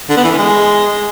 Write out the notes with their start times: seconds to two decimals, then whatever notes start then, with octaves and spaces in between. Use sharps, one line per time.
0.10 D3
0.17 B3
0.24 E3
0.31 C#4
0.38 G#3